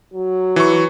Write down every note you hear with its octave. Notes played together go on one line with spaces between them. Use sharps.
F#3
E3 C#6